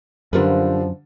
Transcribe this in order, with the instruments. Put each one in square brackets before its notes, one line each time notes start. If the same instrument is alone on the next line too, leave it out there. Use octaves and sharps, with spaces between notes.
[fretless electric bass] F#2 [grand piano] D3 G3 [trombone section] F3 [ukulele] F4 A#4 B4